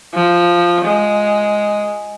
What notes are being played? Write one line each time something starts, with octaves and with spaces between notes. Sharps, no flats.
F3
G#3